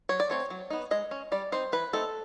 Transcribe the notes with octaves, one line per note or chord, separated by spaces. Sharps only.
F#3 C#5
D5
A3 C4 C#5
F#3
B3 D#4
G#3 D#5
C#4
G3 D5
C4 D#4 C5
E3 B4
A3 C4 D#4 A4